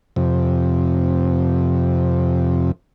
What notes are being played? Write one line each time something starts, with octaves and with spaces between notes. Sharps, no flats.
F2 C3